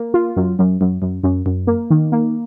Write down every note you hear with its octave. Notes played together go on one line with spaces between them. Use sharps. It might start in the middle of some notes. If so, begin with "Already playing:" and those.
Already playing: A#3
F4
F#2
F#2
F#2
F#2
F#2
F#2
A#3
D#3
A#3